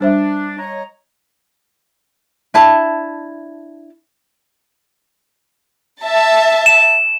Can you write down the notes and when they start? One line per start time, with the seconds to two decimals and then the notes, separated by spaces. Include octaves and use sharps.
0.01 G3 D4 C5 E5
0.58 C#5 D#5 A#5
2.54 D4 E4 A5
6.03 E5 A5
6.66 E7